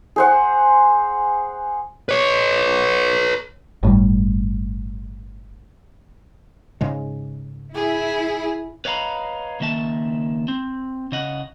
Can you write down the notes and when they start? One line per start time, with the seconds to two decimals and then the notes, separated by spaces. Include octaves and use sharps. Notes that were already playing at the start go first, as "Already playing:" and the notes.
0.16 G#4 C5 F#5
2.09 B4 C#5
3.83 G1 A2 C3 G3
6.81 G#2 C#3 G#3
7.75 E4 G#4
8.85 B4 C#5 D#5 F5 A#5 B5
9.60 C#2 D#3 A#3 E5 A5
10.48 C4
11.12 C#3 D#5 F#5